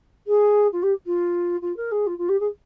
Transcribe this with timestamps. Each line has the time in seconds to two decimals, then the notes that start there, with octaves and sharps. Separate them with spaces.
0.27 G#4
0.72 F4
0.83 G4
1.06 F4
1.62 F4
1.77 A#4
1.92 G#4
2.07 F4
2.18 F4
2.29 G4
2.40 G#4